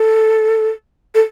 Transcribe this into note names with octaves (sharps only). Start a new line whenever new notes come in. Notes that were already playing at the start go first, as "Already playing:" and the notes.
Already playing: A4
A4